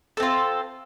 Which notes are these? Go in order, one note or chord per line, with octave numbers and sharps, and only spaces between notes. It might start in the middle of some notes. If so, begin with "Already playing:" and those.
C4 F4 A4